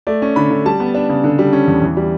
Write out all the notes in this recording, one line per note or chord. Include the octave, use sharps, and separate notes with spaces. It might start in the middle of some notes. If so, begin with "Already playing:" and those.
A3 D5
C#4
D3 B5
D3
G3 A5
B3
D4
C#3
D3
G3
C#4
E2
E3
G3